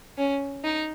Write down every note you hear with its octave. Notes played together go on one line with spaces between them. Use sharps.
C#4
D#4